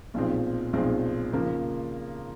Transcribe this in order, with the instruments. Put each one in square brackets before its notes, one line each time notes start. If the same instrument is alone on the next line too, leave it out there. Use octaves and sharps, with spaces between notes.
[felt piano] B1 A#2 F3 G#3 C4
B1 A#2 F3 G#3 C4
C#3 F3 A#3